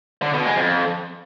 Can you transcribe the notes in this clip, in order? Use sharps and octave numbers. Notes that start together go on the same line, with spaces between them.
D3
B2
G#3
F2